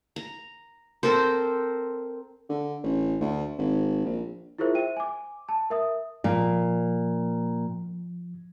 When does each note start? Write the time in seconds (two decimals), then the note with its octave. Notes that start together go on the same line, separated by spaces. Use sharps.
0.16 A#5
1.03 C4 A4 A#4 C5
2.49 D3
2.83 A1
3.21 D2
3.58 G#1
4.04 A#1
4.58 E4 F4 G#4 A#4 C5 E5
4.75 C5 E5 G5 D#7
4.97 G#5 D6
5.49 A5
5.70 A#4 E5 D#6
6.24 A#2 F3